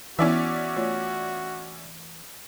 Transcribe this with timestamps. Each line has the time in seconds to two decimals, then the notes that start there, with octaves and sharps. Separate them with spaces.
0.19 E3 B3 C#4 E4 F#4 D5 E5
0.77 A3 F4 C#5